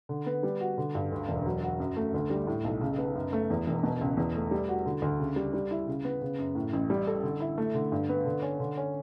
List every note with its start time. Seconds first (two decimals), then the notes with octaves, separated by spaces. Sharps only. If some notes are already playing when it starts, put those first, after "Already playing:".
0.09 D3
0.26 B3
0.43 G3
0.61 F#4
0.78 D3
0.95 G2
1.12 D2
1.29 E1
1.46 F#3
1.63 F#4
1.80 F#2
1.96 A3
2.14 D2
2.30 G3
2.47 A2
2.64 B1
2.81 C#3
2.98 B3
3.15 F#2
3.33 A3
3.50 E2
3.67 E1
3.83 B2
4.01 C#2
4.17 E2
4.35 A3
4.51 G3
4.69 F#4
4.86 D3
5.02 D2
5.20 C#3
5.36 G3
5.53 G3
5.71 E4
5.87 C#3
6.05 B3
6.22 C#3
6.39 F#2
6.55 A2
6.73 A1
6.90 G3
7.07 A4
7.23 D3
7.40 E4
7.58 A3
7.75 D3
7.92 G2
8.09 B3
8.25 D3
8.42 C#4
8.60 D3
8.77 C#4